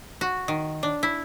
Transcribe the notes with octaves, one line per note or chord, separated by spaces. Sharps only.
F#4
D#3
D4
E4